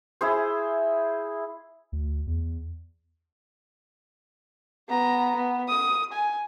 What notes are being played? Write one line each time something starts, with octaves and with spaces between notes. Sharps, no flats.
E4 G#4 C5
D2
E2
B3 A#5
B3
D#6
G#5